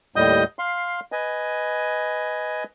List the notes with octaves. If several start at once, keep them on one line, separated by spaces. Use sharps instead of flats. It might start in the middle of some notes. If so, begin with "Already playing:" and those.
D#2 A2 G3 D#5 D#6 G6
F5 C6
B4 D#5 G#5